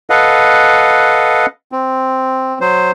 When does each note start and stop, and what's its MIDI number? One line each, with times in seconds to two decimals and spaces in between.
0.10 1.46 69
0.10 1.46 71
0.10 1.46 75
0.10 1.46 77
0.10 1.46 78
1.72 2.59 60
2.61 2.91 54
2.61 2.91 72